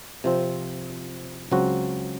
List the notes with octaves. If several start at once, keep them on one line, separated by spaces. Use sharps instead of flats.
C3 F3 C4
C#2 C#3 F#3 C4 F#4